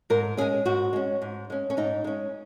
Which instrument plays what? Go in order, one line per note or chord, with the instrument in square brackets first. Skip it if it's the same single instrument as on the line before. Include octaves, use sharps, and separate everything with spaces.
[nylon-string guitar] G#2 A#4
G#3 C#4 G#4
G#2 F#4
G#3 C#4
G#2
G#3 C#4
C#4
G#2 D#4
G#3 C#4